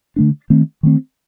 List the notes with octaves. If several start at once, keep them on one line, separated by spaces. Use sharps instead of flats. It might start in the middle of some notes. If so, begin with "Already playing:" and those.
D3 A3 D4
D#3 A3 C4
D#3 A3 C4